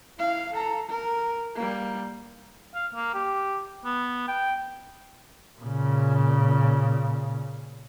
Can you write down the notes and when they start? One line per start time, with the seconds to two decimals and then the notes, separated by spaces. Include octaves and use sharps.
0.18 E4 F5
0.52 A4 A#5
0.89 A#4
1.55 G3 A#3
2.74 F5
2.94 A#3
3.14 G4
3.85 B3
4.28 G5
5.61 A#2 C#3